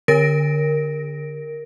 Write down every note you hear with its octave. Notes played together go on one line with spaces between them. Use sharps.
D3 A#4 A#6 D7